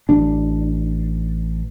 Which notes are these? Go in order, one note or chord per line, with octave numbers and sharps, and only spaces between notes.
A1 D4